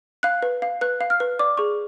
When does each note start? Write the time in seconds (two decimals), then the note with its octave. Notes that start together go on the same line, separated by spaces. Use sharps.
0.23 F5 F#6
0.43 B4
0.62 F5
0.81 B4 F#6
1.01 F5
1.10 F6
1.20 B4
1.39 D5 D6
1.57 G#4 C#6